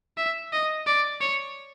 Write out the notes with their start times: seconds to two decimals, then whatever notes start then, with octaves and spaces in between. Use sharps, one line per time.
0.18 E5
0.53 D#5
0.87 D5
1.21 C#5